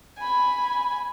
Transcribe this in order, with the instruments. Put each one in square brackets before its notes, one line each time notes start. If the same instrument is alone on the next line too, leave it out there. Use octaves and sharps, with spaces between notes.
[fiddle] G#5 B5